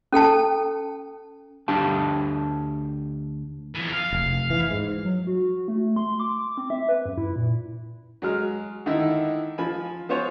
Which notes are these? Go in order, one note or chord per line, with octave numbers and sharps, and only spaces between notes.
C#4 A4 G5 A5
D2 D4 G4 F5 G5 A5
F2 E3
F5
F1
E3
G#2
F#3
F#4
A3
C6
D6
C4
E5
B4
F#2
E4
A#2
F#3 G#3 F6
D3 D#3 D#4 E4
F3 G#5 B5
B3 F4 C5 C#5 G#5